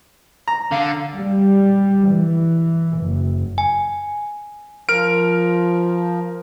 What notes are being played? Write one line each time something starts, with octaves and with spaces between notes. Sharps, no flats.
A#5
D3 F5
G3
E3
F#1
G#5
F3 A#4 F6 D7